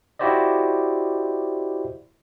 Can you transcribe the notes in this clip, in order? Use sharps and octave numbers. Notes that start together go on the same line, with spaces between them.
E4 F#4 G4 C5 D5 D#5